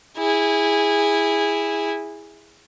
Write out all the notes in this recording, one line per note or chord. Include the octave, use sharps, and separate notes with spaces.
E4 G#4